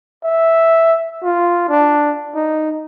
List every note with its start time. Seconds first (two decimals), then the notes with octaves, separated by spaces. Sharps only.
0.24 E5
1.23 F4
1.70 D4
2.35 D#4